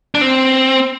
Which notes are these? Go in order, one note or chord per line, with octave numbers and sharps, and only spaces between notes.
D4
C4